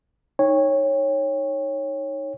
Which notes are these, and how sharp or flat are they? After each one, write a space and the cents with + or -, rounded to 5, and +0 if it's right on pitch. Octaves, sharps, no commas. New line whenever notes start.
D#4 +0 C#5 -10 G5 +35